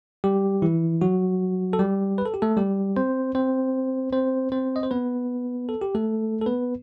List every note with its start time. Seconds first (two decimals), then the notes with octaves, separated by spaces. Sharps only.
0.24 G3 G4
0.62 E3 E4
1.01 F#3 F#4
1.73 A4
1.79 G3 G4
2.18 B4
2.26 A4
2.34 G4
2.42 A3 A4
2.57 G3 G4
2.97 C4 C5
3.35 C4 C5
4.12 C4 C5
4.52 C4 C5
4.76 D#5
4.83 C5
4.91 B3 B4
5.69 A4
5.82 G4
5.95 A3 A4
6.42 A4
6.46 B3 B4